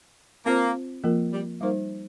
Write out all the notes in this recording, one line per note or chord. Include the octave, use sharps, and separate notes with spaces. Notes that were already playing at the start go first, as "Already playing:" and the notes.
A#3 C4 F4 C5
F3 A#3 F4 A#4
G3
G3 A#3 D#4 C5